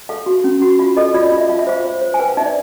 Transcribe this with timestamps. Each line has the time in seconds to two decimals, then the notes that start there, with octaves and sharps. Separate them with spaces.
0.09 A4 F5
0.26 F#4
0.44 C#4
0.62 F#4
0.79 F4 F5
0.97 A4 D#5
1.14 F4 D5
1.26 D#5
1.32 F4
1.38 E5
1.49 F4 F5
1.59 E5
1.67 C5 F5
1.85 C5
2.01 C5
2.14 G#5
2.19 B4 G5
2.28 F5
2.37 D#4 E5
2.46 D5